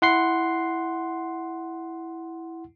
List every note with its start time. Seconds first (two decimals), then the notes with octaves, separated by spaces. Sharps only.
0.02 E4 F#5 C6 C7